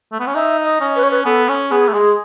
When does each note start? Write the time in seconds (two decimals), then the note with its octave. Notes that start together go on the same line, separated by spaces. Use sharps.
0.12 A3
0.20 B3
0.27 C#4
0.35 D#4 E5
0.65 D#5
0.80 C#4
0.96 B4
1.03 C#5
1.11 B4
1.25 B3 A4
1.49 C#4
1.71 B3 G#4
1.88 A3
1.93 G#3 G#4